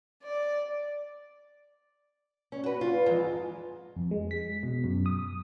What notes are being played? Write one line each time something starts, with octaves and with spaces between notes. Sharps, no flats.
D5
C#4
F#4 B4
F4
F2 G#2 E3 G#3 A#5
F2
G#3
B6
B2
F#2
D#6